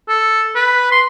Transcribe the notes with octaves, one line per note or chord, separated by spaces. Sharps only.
A4
B4
C6